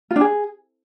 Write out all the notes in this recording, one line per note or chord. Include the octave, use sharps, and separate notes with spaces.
F4
D4
G#4